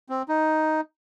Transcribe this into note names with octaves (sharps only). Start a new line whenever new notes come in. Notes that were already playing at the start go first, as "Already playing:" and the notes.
C4
D#4